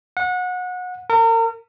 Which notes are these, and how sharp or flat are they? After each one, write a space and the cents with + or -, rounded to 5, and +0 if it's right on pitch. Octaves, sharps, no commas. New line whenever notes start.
F#5 -25
A#4 -35